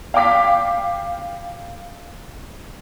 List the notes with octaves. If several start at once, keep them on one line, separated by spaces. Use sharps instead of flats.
F5 G5 D6 B6